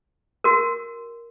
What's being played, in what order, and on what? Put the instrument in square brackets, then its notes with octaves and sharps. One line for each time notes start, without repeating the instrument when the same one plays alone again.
[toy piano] F#4 A#4